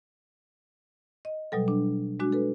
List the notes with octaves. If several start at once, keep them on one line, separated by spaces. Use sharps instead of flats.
D#5
B2 F#3 G3 A4
D4
G#3 D4 F#4
A4 B4